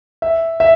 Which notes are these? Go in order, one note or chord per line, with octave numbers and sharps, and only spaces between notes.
E5
E5